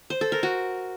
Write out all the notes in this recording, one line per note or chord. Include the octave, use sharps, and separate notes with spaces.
C5
A4
A#4
F#4